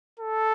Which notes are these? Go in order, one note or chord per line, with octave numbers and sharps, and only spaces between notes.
A4